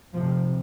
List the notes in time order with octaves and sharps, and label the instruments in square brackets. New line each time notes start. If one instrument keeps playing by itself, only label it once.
[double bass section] F1 F2 C3 F3